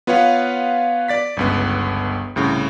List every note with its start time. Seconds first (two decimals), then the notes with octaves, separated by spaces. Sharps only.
0.07 B3 F4 B4 C#5 F5 F#5
1.08 D5 A6 B6
1.37 G1 C#2 B3
2.36 C2 A2 C#3